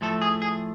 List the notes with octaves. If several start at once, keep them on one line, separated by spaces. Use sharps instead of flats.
A2 F3 A3 A4
G#4
G#4